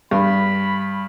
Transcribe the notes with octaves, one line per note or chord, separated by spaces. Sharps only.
G2 B5